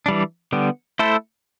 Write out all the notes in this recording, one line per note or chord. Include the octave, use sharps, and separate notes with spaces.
E3 G3 D4
D3 G3 B3
A3 E4 A4 C5